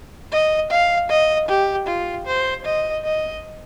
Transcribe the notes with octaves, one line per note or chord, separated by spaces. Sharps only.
D#5
F5
D#5
G4
F4
C5
D#5
D#5